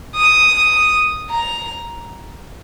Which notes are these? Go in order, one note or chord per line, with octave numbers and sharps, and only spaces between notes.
D#6
A#5